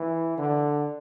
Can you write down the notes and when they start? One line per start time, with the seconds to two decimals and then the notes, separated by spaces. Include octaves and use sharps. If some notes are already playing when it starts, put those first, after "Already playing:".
Already playing: E3
0.38 D3